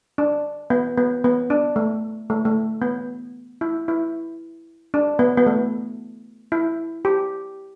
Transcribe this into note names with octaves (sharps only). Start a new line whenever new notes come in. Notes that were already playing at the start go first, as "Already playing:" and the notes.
D4
B3
B3
B3
D4
A3
A3
A3
B3
E4
E4
D4
B3
B3
A3
E4
G4